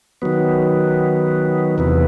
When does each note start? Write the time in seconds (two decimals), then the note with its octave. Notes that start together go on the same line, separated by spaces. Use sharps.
0.22 D#3 F#3 B3
1.78 E2 C3 E3 B3